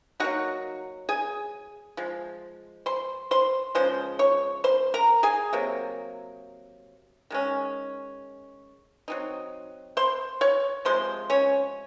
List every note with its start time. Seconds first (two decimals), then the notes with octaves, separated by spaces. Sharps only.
0.20 F#3 A#3 D#4 F#4 F#5
1.09 G#4 G#5
1.97 F3 G#3
2.86 C5 C6
3.31 C5 C6
3.75 C#3 F3 G#3 C5 C6
4.19 C#5 C#6
4.64 C5 C6
4.94 A#4 A#5
5.23 G#4 G#5
5.53 C3 F#3 A#3
7.30 D#3 G#3 C#4
9.08 F#3 C4 D#4
9.97 C5 C6
10.41 C#5 C#6
10.85 C3 F3 G#3 C5 C6
11.30 C#4 C#5